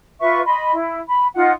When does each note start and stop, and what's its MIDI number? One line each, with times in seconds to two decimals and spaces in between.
0.20 0.40 65
0.20 0.40 71
0.20 0.40 76
0.20 0.40 85
0.45 0.72 75
0.45 0.72 83
0.45 0.72 84
0.72 0.99 64
1.08 1.27 83
1.34 1.51 63
1.34 1.51 65
1.34 1.51 78